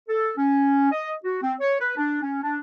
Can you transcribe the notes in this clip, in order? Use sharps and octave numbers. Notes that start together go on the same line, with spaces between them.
A4
C#4
D#5
F#4
C4
C#5
B4
D4
C#4
D4